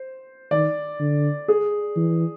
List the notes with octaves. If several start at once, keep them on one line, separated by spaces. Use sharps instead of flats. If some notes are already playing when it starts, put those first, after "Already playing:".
Already playing: C5
D#3 D5
D3
G#4
E3